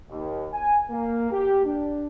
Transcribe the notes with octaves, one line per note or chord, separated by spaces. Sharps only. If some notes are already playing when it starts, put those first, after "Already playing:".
D#2
G#5
A#3
G4
D4